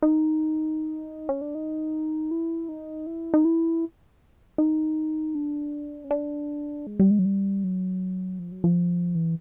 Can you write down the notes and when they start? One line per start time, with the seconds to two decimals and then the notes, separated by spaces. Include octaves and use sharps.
0.02 D#4
1.29 C#4
1.41 D4
1.55 D#4
2.31 E4
2.69 D#4
3.06 E4
3.34 D#4
3.45 E4
4.58 D#4
5.35 D4
6.04 C#4
6.11 D4
6.87 G#3
7.00 G3
7.11 G#3
7.19 F#3
7.25 G3
7.64 F#3
8.39 F3
8.52 F#3
8.64 F3
9.15 E3